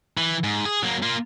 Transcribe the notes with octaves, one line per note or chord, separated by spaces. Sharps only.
E3
G#2
G#4
F#3 A#3
A#3 F4